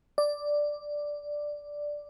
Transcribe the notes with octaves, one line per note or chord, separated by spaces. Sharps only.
D5